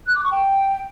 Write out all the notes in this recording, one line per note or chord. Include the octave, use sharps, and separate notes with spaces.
F#6
D6
C#6
G5